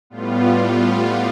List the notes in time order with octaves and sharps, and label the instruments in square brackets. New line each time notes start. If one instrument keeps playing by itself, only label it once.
[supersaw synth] A2 G3 B3 F4